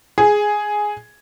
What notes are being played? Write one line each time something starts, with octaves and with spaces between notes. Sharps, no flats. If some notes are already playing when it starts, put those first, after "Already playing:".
G#4